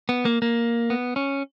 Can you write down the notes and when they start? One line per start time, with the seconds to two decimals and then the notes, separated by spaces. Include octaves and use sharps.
0.09 B3
0.25 A#3
0.42 A#3
0.90 B3
1.16 C#4